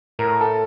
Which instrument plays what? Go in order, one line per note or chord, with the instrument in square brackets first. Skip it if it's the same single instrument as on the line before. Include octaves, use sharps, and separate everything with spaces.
[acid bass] A2 [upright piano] A#4
[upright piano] A4